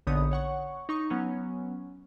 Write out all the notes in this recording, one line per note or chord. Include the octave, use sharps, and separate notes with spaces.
A#1 D3 B3 D#4 C#5 D#6
C#5 F#5 C#6
D#4 C#6
F#3 B3 C#4